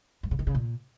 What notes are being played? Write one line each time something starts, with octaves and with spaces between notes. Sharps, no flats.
G2
C#3
D#3
C#3
A#2